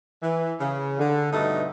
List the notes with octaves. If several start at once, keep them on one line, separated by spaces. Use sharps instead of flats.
E3
C#3
D3
G2 B2 D3 A3 D#4